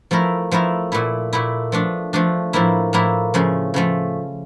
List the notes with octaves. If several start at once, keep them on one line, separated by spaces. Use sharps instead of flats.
F3 A3 E4 A#4
F3 A3 E4 A#4
A#2 A3 E4
A#2 A3 E4
F3 A3 D4
F3 A3 D4
A2 F3 A#3 E4
A2 F3 A#3 E4
C#3 F3 A3
C#3 F3 A3